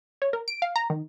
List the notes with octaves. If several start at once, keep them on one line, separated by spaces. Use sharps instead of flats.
C#5
A#4
D7
F5
A#5
D#3